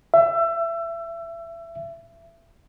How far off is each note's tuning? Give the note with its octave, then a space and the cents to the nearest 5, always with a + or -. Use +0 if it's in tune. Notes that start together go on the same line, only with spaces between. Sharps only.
E5 +25